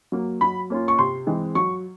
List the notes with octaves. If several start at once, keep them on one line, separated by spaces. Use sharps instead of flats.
F#3 A#3
F#3 B5
A#3 C#4 F4
C#6
C3 C6
E3 G#3 C4
F#3 C#6